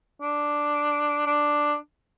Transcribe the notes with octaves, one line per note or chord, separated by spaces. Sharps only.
D4
D4